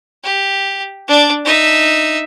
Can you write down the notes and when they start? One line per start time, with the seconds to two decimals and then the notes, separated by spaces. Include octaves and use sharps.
0.23 G4
1.08 D4 D5
1.45 D#4 E5